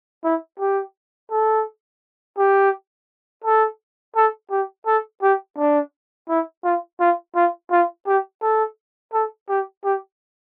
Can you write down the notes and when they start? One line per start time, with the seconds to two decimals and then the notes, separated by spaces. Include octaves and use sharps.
0.24 E4
0.60 G4
1.31 A4
2.38 G4
3.44 A4
4.16 A4
4.51 G4
4.86 A4
5.22 G4
5.57 D4
6.29 E4
6.64 F4
7.00 F4
7.35 F4
7.71 F4
8.07 G4
8.42 A4
9.13 A4
9.49 G4
9.84 G4